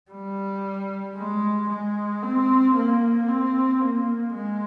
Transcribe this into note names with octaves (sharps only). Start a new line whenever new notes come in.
G3
G#3
G#3
C4
A#3
C4
A#3
G#3